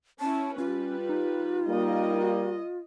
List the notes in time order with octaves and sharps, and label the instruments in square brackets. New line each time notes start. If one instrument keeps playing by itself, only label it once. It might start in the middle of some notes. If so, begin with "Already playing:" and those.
[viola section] C#4 E4 [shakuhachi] A5
[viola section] G3 B4 [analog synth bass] C#4 [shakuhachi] F4
[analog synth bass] D#4
[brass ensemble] G3 A#3 [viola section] D#5